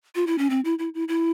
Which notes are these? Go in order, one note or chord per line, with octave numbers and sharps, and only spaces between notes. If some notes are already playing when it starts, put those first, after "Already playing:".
F4
E4
C#4
C4
E4
E4
E4
E4